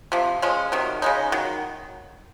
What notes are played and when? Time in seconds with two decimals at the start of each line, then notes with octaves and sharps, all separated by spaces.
0.12 C3 F3
0.42 F3 G#3 C#4
0.72 C3 D#3 F#3
1.02 C#3 G#3 D#4
1.32 D#3 F#3